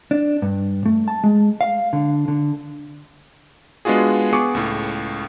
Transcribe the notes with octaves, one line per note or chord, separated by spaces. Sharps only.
D4
G2
A3
A5
G#3
F5
D3
D3
G#3 B3 D4 F4 F#4 G#4
B3 G#4 C#6 D6 C#7
C#2 A2